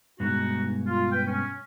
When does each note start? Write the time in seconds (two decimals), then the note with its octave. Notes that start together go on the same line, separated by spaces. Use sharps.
0.20 G2 B2 G#3 D#4 F#4
0.87 F4
1.12 B4 G5
1.27 C#4